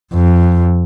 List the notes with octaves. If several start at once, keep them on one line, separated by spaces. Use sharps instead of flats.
F2